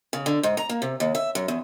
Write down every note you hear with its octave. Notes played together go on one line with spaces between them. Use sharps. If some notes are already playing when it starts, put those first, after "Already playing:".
C#3
D3
G#2
A#5
A#3
C3
D#2
E5
F#2
E2